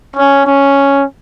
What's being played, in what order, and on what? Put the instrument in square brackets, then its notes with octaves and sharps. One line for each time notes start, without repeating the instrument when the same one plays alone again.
[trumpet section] C#4
C#4